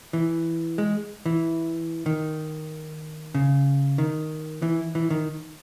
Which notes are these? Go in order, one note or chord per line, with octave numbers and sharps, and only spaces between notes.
E3
G#3
E3
D#3
C#3
D#3
E3
E3
D#3